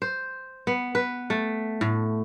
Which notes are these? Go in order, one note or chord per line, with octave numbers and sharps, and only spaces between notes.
C5
B3
B4
A3
A2